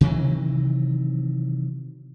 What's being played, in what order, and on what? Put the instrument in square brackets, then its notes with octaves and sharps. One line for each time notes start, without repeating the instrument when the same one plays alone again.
[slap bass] C3 D#3 E3 F#3